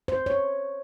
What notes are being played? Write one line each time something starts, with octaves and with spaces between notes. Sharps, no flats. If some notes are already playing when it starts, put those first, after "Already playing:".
C5
C#5